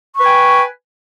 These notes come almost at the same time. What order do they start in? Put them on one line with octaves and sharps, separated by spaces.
C#6 B4 G#5 G5